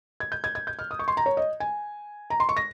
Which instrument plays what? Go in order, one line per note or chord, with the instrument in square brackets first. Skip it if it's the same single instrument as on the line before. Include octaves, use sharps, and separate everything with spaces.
[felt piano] G#6
G6
G#6
G#6
G6
F6
D#6
C#6
C6
A#5
C#5
D#5
G#5
A#5
C6
C#6
A#6